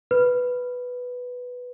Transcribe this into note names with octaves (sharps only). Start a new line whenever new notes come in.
B4